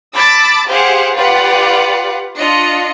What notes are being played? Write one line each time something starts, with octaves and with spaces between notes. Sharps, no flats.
A5 B5 D6 E6 A6
G4 G#4 C5 F5 F#5
F4 G4 B4 D5 F5 F#5
D4 F4 D#5 C#7